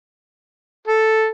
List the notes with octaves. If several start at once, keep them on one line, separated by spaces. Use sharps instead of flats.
A4